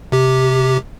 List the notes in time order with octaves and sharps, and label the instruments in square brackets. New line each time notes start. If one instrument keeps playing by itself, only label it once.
[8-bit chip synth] C3 G4